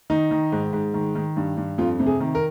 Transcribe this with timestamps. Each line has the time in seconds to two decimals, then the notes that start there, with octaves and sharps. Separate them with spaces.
0.10 D#3 D#4
0.31 D#3
0.52 G#2
0.73 G#2
0.94 D#3
1.15 D#3
1.37 G2
1.57 G2
1.78 F2 F4
2.00 C3
2.06 G#4
2.20 D#3
2.35 A#4